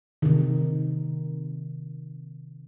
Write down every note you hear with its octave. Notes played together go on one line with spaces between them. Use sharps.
C3 D#3